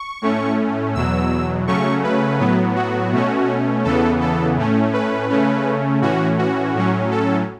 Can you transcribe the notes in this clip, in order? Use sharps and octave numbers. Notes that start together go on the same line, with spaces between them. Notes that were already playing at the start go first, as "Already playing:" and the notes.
Already playing: C#6
A2 A3 C#4
E2 B2 F#3 E6
C#3 F#3 A3 C#4 C#6
B4
A2 F#3 B3
F#4
B2 A3 C#4
E2 C#3 E3 B3 A4
A4
A2 A3 C#4
B4
C#3 A3 C#4
A2 E3 C#4 F#4
F#4
A2 F#3 C#4
A4